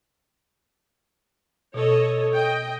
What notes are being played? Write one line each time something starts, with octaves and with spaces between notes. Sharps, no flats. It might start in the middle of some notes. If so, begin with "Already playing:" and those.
B2 A4 C#5 D#5
D#5 G5